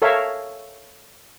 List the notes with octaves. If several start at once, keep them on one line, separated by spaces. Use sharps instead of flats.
A4 A#4 C#5 E5 F5